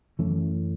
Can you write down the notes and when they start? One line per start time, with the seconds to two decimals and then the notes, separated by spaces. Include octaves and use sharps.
0.19 F#2 E3 A3 C#4